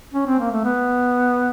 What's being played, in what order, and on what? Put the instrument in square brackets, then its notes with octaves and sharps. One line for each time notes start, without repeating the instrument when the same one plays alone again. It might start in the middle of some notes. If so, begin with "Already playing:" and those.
[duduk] C#4
C4
A#3
A3
B3